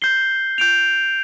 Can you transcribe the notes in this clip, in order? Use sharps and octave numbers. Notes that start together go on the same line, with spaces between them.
G6 C7 G7
G6 D7 F7